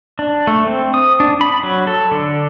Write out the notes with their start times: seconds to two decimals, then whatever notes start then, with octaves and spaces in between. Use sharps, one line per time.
0.19 D4
0.47 A3
0.67 C4
0.94 D#6
1.20 D4
1.41 B5
1.63 F#3
1.87 A4
2.12 D3